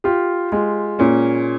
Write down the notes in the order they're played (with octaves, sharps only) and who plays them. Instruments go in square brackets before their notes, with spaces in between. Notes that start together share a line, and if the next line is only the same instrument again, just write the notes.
[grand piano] F4 [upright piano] G4
[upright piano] G#3 [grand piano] F4
[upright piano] A#2 [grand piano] C#4